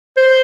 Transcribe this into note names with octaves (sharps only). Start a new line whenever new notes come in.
C5